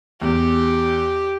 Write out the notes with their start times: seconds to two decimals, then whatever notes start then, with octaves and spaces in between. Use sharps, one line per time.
0.22 E2 G4